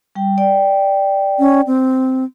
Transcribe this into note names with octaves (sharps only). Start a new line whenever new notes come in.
G3 G5
D5 G5
C#4
C4